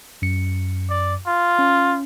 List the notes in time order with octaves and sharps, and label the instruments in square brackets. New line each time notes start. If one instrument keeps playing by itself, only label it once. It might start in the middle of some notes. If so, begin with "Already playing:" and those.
[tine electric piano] F#2 C#7
[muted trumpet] D5
F4
[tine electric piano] C#4